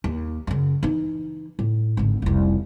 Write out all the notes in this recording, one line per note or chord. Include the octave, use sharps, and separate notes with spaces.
D#2
F#2 C#3
E3 D#4
A2
G#1 D3
F1 C2